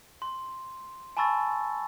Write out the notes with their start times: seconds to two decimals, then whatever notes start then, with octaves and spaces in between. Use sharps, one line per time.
0.22 C6
1.17 G#5 A5 B5 C#6 E6 A6